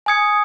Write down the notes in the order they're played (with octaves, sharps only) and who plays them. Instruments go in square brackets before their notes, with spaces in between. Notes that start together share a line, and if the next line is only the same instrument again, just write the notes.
[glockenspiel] G#5 D#6 G#6 C#7